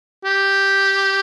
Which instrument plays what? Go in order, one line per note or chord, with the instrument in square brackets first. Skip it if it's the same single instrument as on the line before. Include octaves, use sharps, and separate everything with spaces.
[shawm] G4